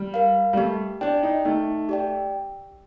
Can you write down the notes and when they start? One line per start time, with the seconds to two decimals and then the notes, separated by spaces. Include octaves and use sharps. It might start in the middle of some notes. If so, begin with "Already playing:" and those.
Already playing: G3
0.14 A#4 F5
0.53 G3
0.57 A3 G4
1.01 D4 D5 G5
1.23 D#4
1.45 A3 D#4
1.89 G4 D5 G5